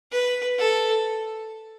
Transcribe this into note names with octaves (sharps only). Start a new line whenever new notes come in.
B4
A4